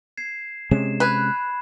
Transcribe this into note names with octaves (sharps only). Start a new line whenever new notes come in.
G#6 C7 E7
C3 G#3 C#4 E7
B4 B5 F#6 G#6